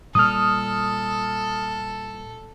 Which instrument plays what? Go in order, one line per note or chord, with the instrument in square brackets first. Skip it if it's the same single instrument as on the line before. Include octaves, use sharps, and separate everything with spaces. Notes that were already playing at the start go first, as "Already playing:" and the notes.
[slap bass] A#2 G3 [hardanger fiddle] A4 [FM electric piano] D#6 F6